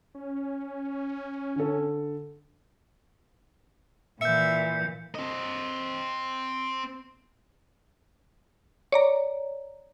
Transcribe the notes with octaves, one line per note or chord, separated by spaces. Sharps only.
C#4
D3 A4
A#2 E3 E5 G6 C#7
C4 D#5
C#5 D5 A#5